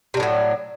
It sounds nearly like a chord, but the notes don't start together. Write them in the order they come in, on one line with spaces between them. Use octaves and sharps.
C3 D4 A2 F#3